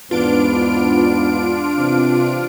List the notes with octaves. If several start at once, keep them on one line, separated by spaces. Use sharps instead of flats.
E2 G#2 B3 D4 F4 D7
C3 E3 C4